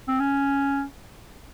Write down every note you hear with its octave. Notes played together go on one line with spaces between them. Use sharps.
C4
C#4